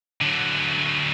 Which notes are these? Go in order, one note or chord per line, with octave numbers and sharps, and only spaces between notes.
D3 F#3